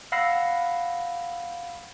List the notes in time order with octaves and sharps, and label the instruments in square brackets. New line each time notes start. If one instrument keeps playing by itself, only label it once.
[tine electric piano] F5 F#5 B5 E6 A#6 C7